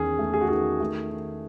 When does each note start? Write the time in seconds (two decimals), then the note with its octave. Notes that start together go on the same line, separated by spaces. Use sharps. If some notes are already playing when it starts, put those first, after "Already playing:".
Already playing: E2 D#3 C#4 G#4
0.19 A3
0.34 G#4
0.41 F#4
0.49 D#3 G#4
0.80 A3
1.11 D#3